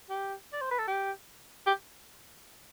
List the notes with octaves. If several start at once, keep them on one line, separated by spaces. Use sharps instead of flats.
G4
D5
C5
B4
A4
G4
G4